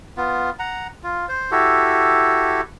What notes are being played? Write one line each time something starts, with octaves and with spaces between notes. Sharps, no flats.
B3 F4
F#5 A#5
F4
C5
E4 F#4 G4 A4